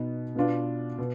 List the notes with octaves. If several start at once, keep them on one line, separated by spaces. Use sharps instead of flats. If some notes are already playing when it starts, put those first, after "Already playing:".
Already playing: B2 B3 D#4
B2 B3 D4 F4
B2